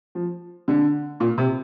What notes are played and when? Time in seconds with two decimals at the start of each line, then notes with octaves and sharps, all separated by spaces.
0.15 F3
0.68 D3
1.20 A#2
1.38 C3